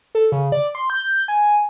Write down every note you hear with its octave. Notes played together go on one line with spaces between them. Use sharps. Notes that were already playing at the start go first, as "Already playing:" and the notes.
A4
C#3
D5
C6
G6
G#5